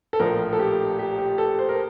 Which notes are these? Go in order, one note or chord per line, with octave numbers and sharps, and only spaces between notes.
A4
A#1 A2 F3 A#4
A4
G4
G4
G4
A4
C5
A#4